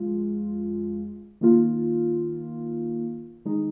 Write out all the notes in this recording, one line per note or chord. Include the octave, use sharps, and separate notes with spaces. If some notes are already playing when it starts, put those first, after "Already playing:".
Already playing: F2 G#3 F4
D#3 A#3 F4
D#3 G#3 D#4